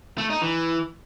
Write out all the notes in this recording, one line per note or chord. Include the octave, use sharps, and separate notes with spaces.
A3
D#4
E3